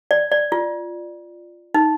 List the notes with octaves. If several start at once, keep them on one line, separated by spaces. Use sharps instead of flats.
D5
D5
F4
D#4